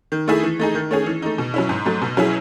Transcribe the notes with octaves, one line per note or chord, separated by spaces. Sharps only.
D#3
A3 E4 G#4
E3
A3 D#4 G#4
D#3
A3 C#4 G#4
E3
A3 D#4
B2
F#3 C#4 E4
G#2
F#3 A3
B2
F#3 C#4 E4 G#4